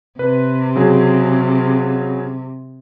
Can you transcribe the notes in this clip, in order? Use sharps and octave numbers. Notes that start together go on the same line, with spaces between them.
C3 B4
C#3 F#3 G#4